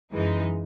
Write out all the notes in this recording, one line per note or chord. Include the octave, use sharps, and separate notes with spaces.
F#2 E3 G#3 D#4